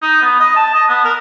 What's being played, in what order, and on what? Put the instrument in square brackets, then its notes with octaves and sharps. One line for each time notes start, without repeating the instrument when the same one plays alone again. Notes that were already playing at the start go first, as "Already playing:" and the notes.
[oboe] D#4
B3
D#5
A5
D#5
B3
A#4